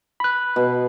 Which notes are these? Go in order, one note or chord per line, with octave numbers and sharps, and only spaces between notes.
B5 F#6
B2